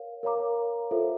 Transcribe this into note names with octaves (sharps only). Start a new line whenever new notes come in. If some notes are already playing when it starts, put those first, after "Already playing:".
Already playing: A#4 C#5 F5
A#4 C#5 F5 A#5 D6
F4 A4 C5 E5